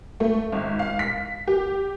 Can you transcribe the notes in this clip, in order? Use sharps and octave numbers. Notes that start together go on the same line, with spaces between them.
A3
G#1
F5
B6
G4